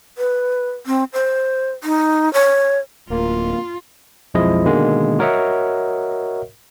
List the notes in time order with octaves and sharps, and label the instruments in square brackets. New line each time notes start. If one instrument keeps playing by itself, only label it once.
[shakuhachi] B4
C4
C5
D#4
C#5
[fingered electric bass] D1 [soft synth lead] A#3 [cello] F4
[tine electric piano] B1 F2 F3 G#3 E4 D#5
B2 D3 D#3 G#3 A#3
F#4 A#4 C#5 D#5 E5 F#5